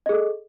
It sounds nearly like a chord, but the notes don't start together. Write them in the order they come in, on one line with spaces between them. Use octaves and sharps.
D#5 G#4 A4